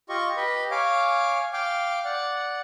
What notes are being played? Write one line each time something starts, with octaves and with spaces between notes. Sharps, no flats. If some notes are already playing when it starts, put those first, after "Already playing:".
F4 G4 D#5 C#6
G4 B4 D#5
C#5 F5 G#5 D6
F5 G5 D6
D5 F#5